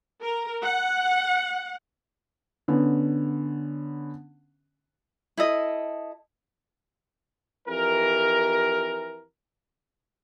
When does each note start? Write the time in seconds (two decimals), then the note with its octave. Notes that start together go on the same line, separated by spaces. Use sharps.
0.22 A#4
0.62 F#5
2.68 D3 B3 C#4
5.37 E4 A4 D#5
7.68 F2 E3 G4 A#4